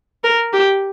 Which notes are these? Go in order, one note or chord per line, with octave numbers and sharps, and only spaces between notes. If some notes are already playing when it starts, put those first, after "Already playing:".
A#4
G4